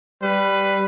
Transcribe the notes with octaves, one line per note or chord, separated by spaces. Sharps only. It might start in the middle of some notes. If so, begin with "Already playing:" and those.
G3 B4